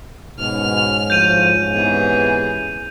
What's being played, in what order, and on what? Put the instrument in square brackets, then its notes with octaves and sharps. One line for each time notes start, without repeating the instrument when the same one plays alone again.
[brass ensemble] G#2 C#4 [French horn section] B2 [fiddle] F6
[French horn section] D2 A2 F3 [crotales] G6 D#7 F7
[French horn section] C3 E3 B3 [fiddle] G#4